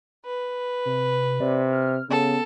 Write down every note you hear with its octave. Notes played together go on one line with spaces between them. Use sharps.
B4
C3
C3 D5
F6
C#3 B3 A4